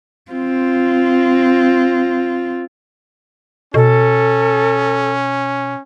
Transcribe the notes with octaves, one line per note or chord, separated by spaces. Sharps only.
C4 F4
B2 C#4 A4